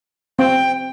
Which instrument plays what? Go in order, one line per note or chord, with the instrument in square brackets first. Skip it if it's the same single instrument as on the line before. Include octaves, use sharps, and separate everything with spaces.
[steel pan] C4 [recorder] G5